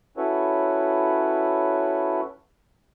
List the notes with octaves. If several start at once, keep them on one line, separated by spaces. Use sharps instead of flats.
C#4 E4 F#4 A4 B4 C#5